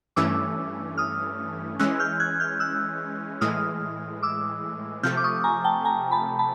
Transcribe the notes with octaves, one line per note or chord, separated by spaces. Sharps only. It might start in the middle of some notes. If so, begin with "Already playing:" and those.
G2 E3 A3 C#4 D6 E6
D#6 F6
E3 G#3 C#4 E6 F#6
F6 G6
F#6 G#6
F6 G6
E6 F#6
A2 E3 G#3 D#6 F6
D6 E6
C3 F3 A3 F6 G6
D6
C#6 D#6
G#5 A#5
G5 A5
G#5 A#5
A5 B5
A5 B5